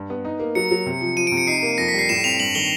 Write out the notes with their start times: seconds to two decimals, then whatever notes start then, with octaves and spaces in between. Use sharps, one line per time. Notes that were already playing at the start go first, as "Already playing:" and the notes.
Already playing: G2
0.10 B3
0.25 D#4
0.40 A#3
0.55 F#3 C#7
0.71 F#3
0.86 C3
1.01 F3
1.17 F3 D#7
1.27 D7
1.32 C3
1.37 C#7
1.47 D#4 C7
1.63 A#3
1.78 F2 A#6
1.88 B6
1.94 G3
1.99 C7
2.09 A2 E7
2.24 C4 F7
2.40 G2 F#7
2.55 D#3 G7